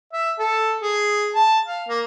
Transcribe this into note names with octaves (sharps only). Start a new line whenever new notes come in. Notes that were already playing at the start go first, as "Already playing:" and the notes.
E5
A4
G#4
A5
F5
A#3